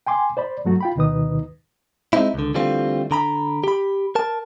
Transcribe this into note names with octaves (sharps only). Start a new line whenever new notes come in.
G5 G#5 C6 D6
C5 D5 B5
G2 F#3 A3 F#4
F4 G5 B5
D2 B2 D#3 D#4 B4 D#6
G#3 A#3 C4 D#4 E4
C#2 D3
D3 E3 G3 A3 C4 F4
D3 A#5 B5
G4 B5
A#4 A5